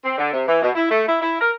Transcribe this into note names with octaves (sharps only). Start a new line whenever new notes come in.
C4
D3
C3
E3
B2
E4
A3
E4
E4
A#4